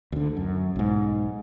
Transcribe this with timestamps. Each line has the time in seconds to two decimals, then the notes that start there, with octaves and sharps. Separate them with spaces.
0.12 D2 D3
0.37 F#2
0.76 B1 G#2